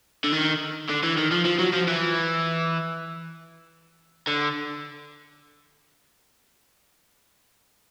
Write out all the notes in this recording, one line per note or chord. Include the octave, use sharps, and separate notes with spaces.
D3
D#3
D3
E3
D#3
F3
F3
F#3
F3
E3
D3